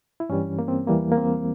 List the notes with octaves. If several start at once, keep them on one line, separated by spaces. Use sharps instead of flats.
E4
G2 E3 G3 C#4
A#3
C4
E2 E3 G3 A#3
A#3
C4